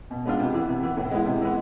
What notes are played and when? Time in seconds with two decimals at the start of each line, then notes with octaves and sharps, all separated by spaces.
0.11 B2
0.26 G#3 B3 D4 F4
0.40 C3
0.54 E3 B3
0.69 C3
0.83 E3 B3
0.97 A2
1.12 G#3 B3 E4
1.26 C3
1.41 E3 G#3 B3